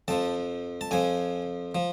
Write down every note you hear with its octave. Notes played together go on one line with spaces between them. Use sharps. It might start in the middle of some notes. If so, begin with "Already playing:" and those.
F2 F3 A5
A5
F2 F3 G#5
F3